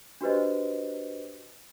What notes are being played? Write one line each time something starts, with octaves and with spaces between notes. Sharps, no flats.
D4 F#4 G4 B4 C5 D#5